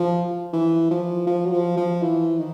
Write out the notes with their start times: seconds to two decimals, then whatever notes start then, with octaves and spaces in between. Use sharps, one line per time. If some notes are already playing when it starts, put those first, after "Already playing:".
Already playing: F3
0.53 E3
0.91 F3
1.27 F3
1.46 F#3
1.52 F3
1.77 F3
2.02 E3
2.39 D#3